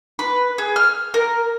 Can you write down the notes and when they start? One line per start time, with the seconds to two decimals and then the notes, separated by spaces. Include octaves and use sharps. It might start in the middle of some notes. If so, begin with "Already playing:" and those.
0.19 B4
0.58 G#4
0.76 F6
1.14 A#4